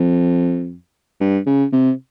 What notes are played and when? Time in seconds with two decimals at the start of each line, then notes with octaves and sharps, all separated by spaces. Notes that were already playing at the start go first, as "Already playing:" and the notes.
Already playing: F2
1.20 G2
1.46 C#3
1.73 C3